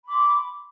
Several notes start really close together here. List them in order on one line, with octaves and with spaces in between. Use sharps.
B5 D6 C6